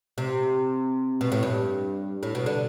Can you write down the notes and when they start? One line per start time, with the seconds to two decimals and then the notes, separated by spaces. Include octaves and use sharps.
0.18 C3
1.21 B2
1.32 A2
1.43 G2
2.23 A2
2.35 B2
2.46 D3